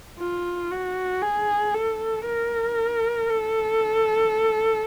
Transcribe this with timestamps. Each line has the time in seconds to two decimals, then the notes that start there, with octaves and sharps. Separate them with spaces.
0.20 F4
0.71 F#4
1.22 G#4
1.75 A4
2.26 A#4
3.30 A4